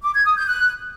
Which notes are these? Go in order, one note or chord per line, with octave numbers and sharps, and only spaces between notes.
D6
G#6
D#6
G6
F#6